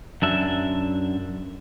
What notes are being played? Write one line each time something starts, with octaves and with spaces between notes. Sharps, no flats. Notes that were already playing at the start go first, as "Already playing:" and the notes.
F#2 D4 E5